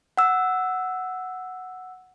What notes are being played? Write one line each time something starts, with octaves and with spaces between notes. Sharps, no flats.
F#5 E6